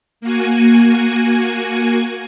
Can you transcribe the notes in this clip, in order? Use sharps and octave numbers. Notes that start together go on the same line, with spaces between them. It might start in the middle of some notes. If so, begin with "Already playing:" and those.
A#3 F#4 G#5